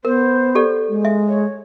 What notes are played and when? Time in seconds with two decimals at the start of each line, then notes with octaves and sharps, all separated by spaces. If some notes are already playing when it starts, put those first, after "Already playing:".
0.05 B3 A#4 C5
0.55 G4 A4 D5
0.89 G#3
1.05 E5
1.28 C#5